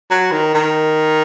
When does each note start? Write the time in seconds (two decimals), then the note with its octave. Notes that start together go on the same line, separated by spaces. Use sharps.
0.10 F#3
0.32 D#3
0.55 D#3